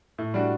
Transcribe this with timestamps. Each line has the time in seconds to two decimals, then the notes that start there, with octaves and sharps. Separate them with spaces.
0.18 A2
0.34 G3 D4 F#4